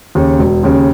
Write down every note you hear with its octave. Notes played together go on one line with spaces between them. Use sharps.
D#2 C#3
E1
D#2 C#3